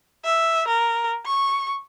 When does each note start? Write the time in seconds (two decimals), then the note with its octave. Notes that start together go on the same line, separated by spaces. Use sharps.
0.25 E5
0.67 A#4
1.26 C#6